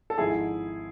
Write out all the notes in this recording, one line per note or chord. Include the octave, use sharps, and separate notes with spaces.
A4
G#1 G#2 F3 E4 G#4